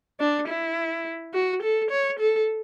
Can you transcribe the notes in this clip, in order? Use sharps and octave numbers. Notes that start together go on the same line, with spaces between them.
D4
E4
F#4
A4
C#5
A4